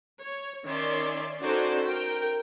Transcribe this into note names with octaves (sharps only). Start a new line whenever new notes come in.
C#5
D#3 C#4 C#5 D5 E5 C6
C#4 D#4 F#4 A4 C5 D5
A#4 G5